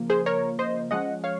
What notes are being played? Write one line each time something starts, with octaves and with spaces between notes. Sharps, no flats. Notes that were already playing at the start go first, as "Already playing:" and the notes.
Already playing: C#3 F3 A#3
G#4 C5
A#4 C#5
C5 D#5
F3 G#3 C#4 D#5 F#5
C#5 F5